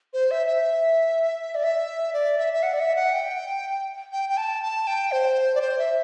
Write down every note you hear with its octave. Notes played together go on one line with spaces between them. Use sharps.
C5
E5
E5
D5
E5
D5
E5
E5
F#5
D5
E5
F#5
G5
G5
G5
A5
A5
G5
C5
D5
C5
E5